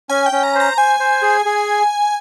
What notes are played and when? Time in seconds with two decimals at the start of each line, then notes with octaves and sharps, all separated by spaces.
0.09 C#4 G#5
0.26 G5
0.32 C#4
0.43 A#5
0.55 C5 A#5
0.77 C5 G#5
1.00 C5
1.22 G#4
1.45 G#4